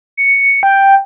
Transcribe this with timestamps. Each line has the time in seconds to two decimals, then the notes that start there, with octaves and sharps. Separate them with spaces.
0.17 C#7
0.63 G5